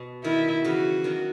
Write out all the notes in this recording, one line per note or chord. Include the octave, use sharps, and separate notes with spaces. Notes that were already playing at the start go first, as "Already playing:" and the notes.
Already playing: B2
D#3 E4
C#3 E3 F#4
D#3 F#3